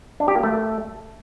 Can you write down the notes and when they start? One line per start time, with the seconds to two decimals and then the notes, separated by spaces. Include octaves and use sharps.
0.20 D4
0.28 G4
0.36 A#3
0.43 A3